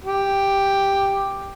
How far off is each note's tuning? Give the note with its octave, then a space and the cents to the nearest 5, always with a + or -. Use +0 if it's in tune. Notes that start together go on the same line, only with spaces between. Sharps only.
G4 +5